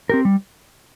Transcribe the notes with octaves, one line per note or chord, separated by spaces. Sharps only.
C4 G4 A#4
G3